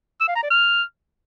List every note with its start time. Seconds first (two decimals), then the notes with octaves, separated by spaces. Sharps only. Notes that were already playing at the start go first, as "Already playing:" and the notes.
0.21 E6
0.28 F5
0.36 A#5
0.43 D5
0.50 F6